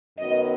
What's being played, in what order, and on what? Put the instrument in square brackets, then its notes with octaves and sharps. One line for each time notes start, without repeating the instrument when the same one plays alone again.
[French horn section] F#2 D#3 F#3 B3 D#5